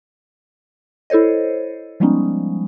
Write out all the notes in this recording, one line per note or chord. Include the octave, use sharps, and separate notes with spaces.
E4 A4 C5 C#5 D#5
F3 G3 G#3 B3 C#4 D#4